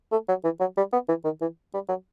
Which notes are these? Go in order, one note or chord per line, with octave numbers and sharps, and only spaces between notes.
A3
F#3
E3
F#3
G3
B3
E3
D#3
E3
G3
F#3